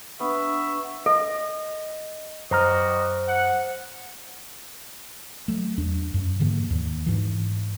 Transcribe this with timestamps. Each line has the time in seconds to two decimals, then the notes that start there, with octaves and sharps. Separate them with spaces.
0.20 B3 D4 E5 C#6
1.06 A4 D#5
2.51 F#2 G3 F#4 C5 D#5 A#5 F6
3.28 F#5
5.48 F#3 A3
5.78 E2 D4
6.14 F#2
6.40 G#2 D3 E3 A#3
6.70 D#2
7.06 G#2 E3